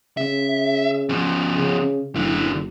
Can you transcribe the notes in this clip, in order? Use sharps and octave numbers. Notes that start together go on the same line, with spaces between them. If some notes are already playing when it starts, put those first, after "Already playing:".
C#3 E5
F3 C#4
C#3
F#1 D3 E4